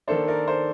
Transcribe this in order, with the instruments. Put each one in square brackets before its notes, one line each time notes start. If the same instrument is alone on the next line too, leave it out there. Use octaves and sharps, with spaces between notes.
[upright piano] D#3 A#3 D4 A4 C5
A#4 D5
A4 C5